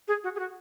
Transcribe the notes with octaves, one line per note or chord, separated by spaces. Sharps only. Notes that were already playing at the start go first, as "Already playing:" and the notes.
G#4
F#4
G#4
F#4